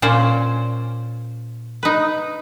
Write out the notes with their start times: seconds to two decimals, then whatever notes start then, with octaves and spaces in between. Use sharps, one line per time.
0.02 A#2 C#4 C5 D5
1.83 D#4 B4